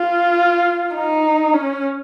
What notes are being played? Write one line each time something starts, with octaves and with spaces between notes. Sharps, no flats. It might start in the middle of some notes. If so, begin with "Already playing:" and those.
Already playing: F4
D#4
C#4